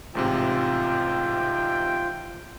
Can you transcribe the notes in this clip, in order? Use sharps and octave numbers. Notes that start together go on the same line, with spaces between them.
A1 G#2 C3 F4 G5